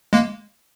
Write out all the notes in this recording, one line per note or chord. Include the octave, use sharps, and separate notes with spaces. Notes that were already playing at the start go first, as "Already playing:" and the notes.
G#3 A#3